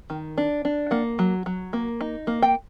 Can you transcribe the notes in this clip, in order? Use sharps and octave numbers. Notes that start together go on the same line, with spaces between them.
D#3
D4
D4
A#3 F#5
F#3
F#3
A#3
D#4
A#3
G5